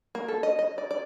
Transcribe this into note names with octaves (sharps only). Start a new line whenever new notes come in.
A#3
A4
D#5
D#5
D5
D5